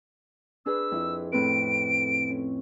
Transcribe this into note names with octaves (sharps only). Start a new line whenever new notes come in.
D4 G#4 B4 E6
F2 E4
A2 C4 B4 D7
C#4